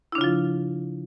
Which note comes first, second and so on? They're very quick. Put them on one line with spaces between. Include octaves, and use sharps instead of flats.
E4 D4 C#3 F4 F3